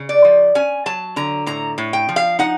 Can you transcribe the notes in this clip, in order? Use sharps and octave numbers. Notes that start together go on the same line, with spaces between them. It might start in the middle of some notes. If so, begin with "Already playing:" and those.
Already playing: C#3
D5
F3
C#4 G#5
F#3 A5
D3 A#5
A2 A#5
A2
G5
F3
F5
D#4 F#5